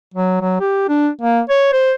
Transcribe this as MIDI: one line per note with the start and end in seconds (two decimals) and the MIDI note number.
0.14 0.37 54
0.41 0.58 54
0.60 0.86 67
0.89 1.09 62
1.21 1.40 58
1.50 1.73 73
1.73 1.93 72